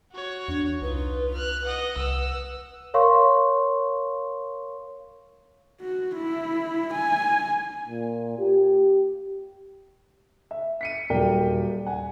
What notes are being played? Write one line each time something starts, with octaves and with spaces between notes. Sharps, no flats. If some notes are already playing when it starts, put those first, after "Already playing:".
F#4 C#5
E2 D4
C2 D#4 F4 B4
F6 F#6
D#5 F#5
C2 F#5 E6
A#4 C#5 F5 C6 C#6
F#4
E4
G#5
A#2
G4
E5
B6 C#7 D#7
D#1 F#3 A#4 D5 G5
F#5 G#5